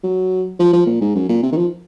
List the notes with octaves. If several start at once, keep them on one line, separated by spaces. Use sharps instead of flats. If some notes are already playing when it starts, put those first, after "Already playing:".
F#3
F3
F3
A#2
G#2
F#2
A#2
C3
D#3
F3